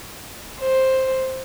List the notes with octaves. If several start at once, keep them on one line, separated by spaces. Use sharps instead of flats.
C5